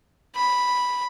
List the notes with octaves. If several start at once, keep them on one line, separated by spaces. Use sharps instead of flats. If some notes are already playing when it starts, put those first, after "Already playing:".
B5